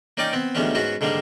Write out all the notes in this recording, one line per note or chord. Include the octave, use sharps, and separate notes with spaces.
A#3 C#4 D#4 D5 G5 D6
B3 C4
D2 D#3 G3 G#3 B3 C#4
G#2 B3 C#4 F#4
G#2 D3 D#3 G3 A#3